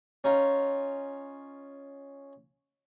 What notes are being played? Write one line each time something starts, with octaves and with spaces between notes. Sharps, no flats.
C#4 D#4 F4